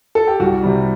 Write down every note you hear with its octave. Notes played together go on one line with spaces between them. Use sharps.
A4
G4
C2 F#4
C3 G3